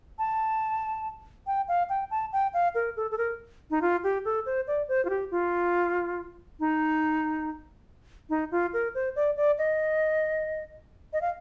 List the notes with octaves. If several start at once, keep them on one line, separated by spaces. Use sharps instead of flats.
A5
G5
F5
G5
A5
G5
F5
A#4
A4
A4
A#4
D#4
F4
G4
A4
C5
D5
C5
F4
G4
F4
D#4
D#4
F4
A#4
C5
D5
D5
D#5
D#5
F5